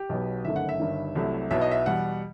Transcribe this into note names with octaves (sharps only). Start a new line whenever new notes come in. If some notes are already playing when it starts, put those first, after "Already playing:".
Already playing: G4
B1 B2 F#3 B3
G1 F#2 D#3 A3 E5
F#5
E5
G1 G2 D#3
C2 C3 F#3 A3 E4
B1 B2 F#3 B3 E4 E5
D#5
E5
E2 B2 G3 F#5